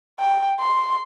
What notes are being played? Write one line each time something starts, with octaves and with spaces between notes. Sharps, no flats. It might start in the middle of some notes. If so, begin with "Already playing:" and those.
G5
C6